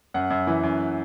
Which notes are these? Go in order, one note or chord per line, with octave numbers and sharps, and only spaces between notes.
F#2 F#5
F#2
E3
F#2